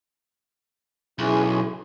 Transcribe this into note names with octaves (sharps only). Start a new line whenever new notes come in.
B1 F#3 C#4 E4 G#4 G#5